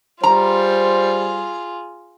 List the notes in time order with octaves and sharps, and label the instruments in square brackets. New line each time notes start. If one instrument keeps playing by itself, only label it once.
[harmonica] G3 [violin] F4 G#4 [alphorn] C5 [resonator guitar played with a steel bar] A#5